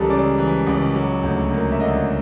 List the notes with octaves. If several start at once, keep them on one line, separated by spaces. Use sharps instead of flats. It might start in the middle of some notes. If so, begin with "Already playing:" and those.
Already playing: C#2 E3 G3 A4 A#4
C#3 D5
E3
C#2
F#3
D2
A#3
E5
D3 D#5